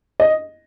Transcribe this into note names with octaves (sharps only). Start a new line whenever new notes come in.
D#5